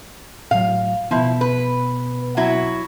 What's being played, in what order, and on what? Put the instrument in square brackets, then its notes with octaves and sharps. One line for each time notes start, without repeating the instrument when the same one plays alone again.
[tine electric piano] A2 F#3 [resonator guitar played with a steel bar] F5
[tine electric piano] B2 B3 [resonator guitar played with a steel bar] F3 E4
[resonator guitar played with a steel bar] B4
F#3 E4 F#4